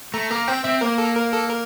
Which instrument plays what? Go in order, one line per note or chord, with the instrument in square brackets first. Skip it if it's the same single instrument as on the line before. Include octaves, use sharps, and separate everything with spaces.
[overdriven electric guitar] A3 [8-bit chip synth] A#5
[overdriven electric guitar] A#3 [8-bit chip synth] A#5
[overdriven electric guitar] C4 [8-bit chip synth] G5
[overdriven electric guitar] C4 [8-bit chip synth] E5
[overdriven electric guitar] A#3 [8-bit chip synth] A#4
[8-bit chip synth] A4
A#4
A4
A#4